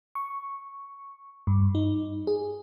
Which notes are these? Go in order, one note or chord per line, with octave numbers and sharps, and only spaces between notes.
C#6
G2
D#4
G#4